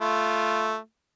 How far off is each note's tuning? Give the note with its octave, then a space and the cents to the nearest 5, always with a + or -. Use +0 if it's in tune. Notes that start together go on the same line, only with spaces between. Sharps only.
A3 -5 F4 -15